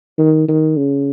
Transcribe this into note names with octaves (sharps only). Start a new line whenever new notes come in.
D#3
D#3
C#3